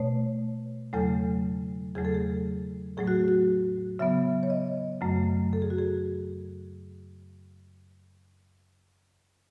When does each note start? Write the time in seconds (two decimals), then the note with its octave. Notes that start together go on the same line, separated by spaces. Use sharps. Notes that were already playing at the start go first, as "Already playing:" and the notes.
Already playing: B2 A3 C#5
0.93 E2 C#3 F#3 A3 A4
1.95 E2 C#3 F#3 A3 G#4
2.05 A4
2.14 G#4
2.97 A2 F#3 A3 G#4
3.07 F#4
3.28 F#4
3.99 C#3 F#3 B3 E5
4.43 C#5
4.50 D#5
5.01 F#2 C#3 F#3 A3
5.53 A4
5.62 G#4
5.70 F#4
5.79 G#4